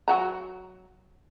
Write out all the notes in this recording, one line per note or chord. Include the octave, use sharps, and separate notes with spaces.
F#3 F#4 A#5